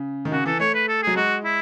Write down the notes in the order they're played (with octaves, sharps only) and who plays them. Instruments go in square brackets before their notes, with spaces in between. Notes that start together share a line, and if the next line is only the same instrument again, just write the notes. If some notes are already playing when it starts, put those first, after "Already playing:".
Already playing: [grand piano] C#3
D#3
[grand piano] C#3 [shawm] F#4
[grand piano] E3 [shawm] A4
[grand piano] A3 [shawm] C#5
[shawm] B4
A4
G#4
[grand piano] F#3
[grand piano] G#3 [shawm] F#4
[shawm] E4